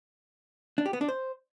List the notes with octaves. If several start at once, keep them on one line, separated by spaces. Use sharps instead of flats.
D4
G4
B3
D4
C5